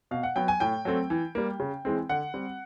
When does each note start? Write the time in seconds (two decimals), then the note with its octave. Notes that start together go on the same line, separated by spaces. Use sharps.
0.11 B2 F5
0.23 F#5
0.36 F#3 B3 G5
0.48 G#5
0.60 A2 G5
0.85 F#3 A3 C4
1.10 E3
1.35 G3 A#3
1.60 C#3
1.85 E3 G#3 C4
2.09 D3 F#5
2.34 G3 C4